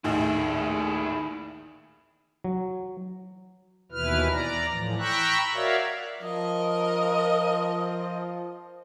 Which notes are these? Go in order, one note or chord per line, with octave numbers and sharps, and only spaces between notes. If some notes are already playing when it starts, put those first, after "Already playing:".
A#1 D#2 A2 D#3 D#4 E4 G#4
F#3
D#2 B2 E3 E4 B4 F6
D5 A#5
A2 E3 F3
G5 A#5 B5 C#6 E6 F#6
F#4 A#4 C#5 D5 E5 F5
F3 A#4 D#5